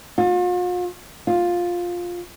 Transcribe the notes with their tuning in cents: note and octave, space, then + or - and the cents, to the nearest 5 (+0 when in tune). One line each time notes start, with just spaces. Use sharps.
F4 +45
F4 +10